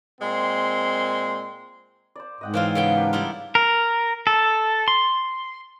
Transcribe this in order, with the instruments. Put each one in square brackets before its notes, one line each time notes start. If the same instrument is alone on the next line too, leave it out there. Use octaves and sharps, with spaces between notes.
[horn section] A#2 G#3 C4 C6
[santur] C5 D5
[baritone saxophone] G#2 [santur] D#5 F#5 G5
[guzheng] E3 C4 F4 [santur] C#5 F5 F#5
[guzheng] C#3 B3 G5
[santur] D4 G4 A#4
[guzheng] G3 E4 F4
[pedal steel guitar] A#4
A4
C6